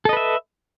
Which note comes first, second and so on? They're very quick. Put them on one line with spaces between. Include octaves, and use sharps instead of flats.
A4 D#5 B4 E5